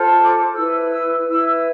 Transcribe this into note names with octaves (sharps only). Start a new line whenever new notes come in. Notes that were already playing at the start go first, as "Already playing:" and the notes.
Already playing: F4 A4 C5
D6
E4 B4 E6
E6
E4 B4 E6